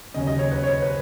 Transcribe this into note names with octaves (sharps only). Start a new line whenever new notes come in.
D#2 C#3 F#3 C#4 D#5
D#5
C#5
B4
C#5
B4